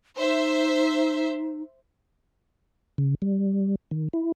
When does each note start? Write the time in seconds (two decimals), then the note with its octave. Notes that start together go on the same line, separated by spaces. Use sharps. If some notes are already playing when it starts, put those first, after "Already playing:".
0.18 D#4 C5 E5
2.98 C#3
3.22 G3
3.91 D#3
4.13 E4